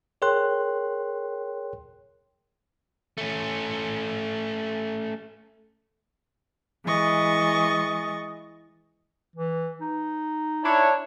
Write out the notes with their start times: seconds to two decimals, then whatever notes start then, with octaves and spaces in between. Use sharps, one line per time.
0.22 G#4 A#4 C#5 G5 C6 F#6
3.18 A3 C#4
6.85 E3 G#3 D#5 C#6 A6
9.36 E3
9.81 D#4
10.64 D4 E4 C#5